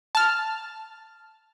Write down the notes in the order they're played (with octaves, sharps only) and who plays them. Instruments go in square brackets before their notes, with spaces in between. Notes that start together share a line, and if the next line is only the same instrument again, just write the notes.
[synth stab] A5 F6